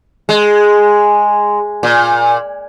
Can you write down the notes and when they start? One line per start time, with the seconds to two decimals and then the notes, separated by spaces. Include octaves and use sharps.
0.29 G#3
1.83 A#2